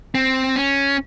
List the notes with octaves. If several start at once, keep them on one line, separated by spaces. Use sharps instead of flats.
C4
C#4